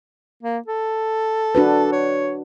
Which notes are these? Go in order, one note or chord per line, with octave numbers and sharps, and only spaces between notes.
A#3
A4
D4 F#4 B4
C#5